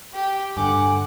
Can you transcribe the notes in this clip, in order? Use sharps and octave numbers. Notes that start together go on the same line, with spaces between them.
G4
G2 D3 F#5 G#5 D6